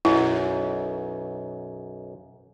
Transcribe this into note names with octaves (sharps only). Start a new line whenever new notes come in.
B1 F#2 E4